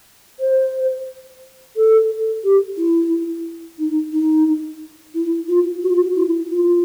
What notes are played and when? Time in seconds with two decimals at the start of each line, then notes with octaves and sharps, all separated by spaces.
0.40 C5
1.76 A4
2.44 G4
2.77 E4
3.79 D#4
4.12 D#4
5.15 E4
5.48 F4
5.83 F#4
5.91 F4
6.00 F#4
6.16 E4
6.50 F4